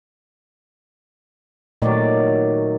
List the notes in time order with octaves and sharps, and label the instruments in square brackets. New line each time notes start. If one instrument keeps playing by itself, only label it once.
[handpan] A#2 A3 D5 [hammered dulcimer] D#3 F#3